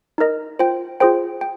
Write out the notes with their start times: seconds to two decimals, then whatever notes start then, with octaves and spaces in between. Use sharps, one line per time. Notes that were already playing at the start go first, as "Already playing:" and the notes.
0.18 D#4 A#4 D#5
0.59 F4 C5 G5
1.00 F4 G#4 C5 G5
1.41 G5